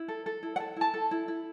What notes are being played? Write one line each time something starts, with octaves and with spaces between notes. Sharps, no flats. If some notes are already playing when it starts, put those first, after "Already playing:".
Already playing: E4
A4
A4
E4
F#5
A4
E4 A5
A4
E4
E4